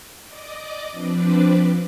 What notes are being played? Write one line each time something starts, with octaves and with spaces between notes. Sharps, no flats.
D5 D#5 D6
F3 C4 D4 B4 D5